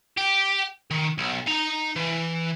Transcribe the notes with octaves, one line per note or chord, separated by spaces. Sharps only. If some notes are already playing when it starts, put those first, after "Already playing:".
G4
D#3
B1
D#4 A#5
E3